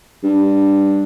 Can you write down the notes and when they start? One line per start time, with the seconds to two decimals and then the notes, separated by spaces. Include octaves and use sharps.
0.23 G2